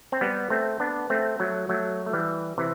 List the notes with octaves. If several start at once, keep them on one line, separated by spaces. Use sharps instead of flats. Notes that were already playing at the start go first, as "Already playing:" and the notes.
C4
G3 B3
A3 C4
B3 D4
A3 C4
F#3 A3
F#3 A3
A3
E3 G3
C3 E3